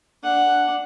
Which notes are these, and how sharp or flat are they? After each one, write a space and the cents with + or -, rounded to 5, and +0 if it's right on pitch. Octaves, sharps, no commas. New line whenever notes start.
D4 +0 F#5 +0